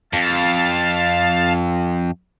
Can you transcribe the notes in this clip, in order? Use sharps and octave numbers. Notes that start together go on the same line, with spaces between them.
F2 F5 A5